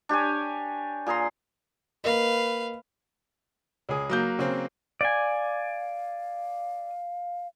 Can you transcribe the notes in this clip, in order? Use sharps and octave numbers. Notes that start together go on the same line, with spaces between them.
D4 G4 C#5 G#5
A#2 G#4 A#5 C6
A#3 A#4 B4 D#5 F5
C#2 G#4
F#3 A#3 G6
C#3 C4
D5 F5 G#5